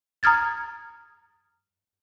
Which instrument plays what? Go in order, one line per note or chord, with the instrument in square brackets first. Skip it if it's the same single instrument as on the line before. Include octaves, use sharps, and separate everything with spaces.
[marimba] A#5 D#6 F6 G#6 A6